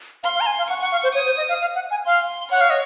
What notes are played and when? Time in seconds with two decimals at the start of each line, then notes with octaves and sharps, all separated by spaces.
0.23 F5 C6
0.35 F5
0.41 A#5
0.46 G#5
0.58 F5
0.69 F#5 C#6
0.81 F#5
0.92 F5
1.03 C5
1.14 C#5 D#6
1.26 C5
1.37 D#5
1.49 F5
1.61 F5
1.75 F#5
1.91 G#5
2.06 F5 C6
2.51 C#5 F#5
2.61 F5
2.70 D#5